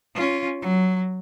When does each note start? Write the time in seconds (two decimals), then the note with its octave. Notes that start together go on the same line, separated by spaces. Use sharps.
0.15 C#4 F4
0.62 F#3